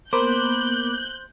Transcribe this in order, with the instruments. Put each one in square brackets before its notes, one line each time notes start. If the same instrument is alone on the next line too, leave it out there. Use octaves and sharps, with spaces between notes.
[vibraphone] A#3 B3 [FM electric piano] A#4 B5 D6 [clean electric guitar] C5 [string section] F#6 G6